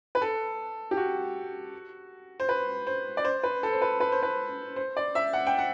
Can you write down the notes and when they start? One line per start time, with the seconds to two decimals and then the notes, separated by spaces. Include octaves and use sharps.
0.15 B4
0.22 A4
0.91 G4
0.97 F#4
2.40 C5
2.49 B4
2.87 C5
3.17 D5
3.25 C5
3.43 B4
3.63 A4
3.73 C5
3.82 B4
4.00 B4
4.12 C5
4.23 B4
4.76 C5
4.97 D5
5.15 E5
5.33 F#5
5.47 G5
5.58 F#5